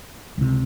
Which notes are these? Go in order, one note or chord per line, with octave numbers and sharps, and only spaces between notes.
C#2 C3